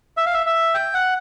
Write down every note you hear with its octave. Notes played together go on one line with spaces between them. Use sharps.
E5
F5
E5
E5
G5
F#5